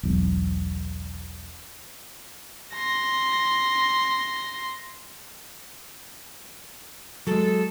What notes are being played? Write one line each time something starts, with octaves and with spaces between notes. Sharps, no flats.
E1 B1
C6 A#6
F#3 G#3 A4